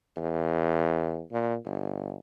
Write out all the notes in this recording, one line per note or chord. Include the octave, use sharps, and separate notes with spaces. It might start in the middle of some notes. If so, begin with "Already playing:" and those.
E2
A#2
G1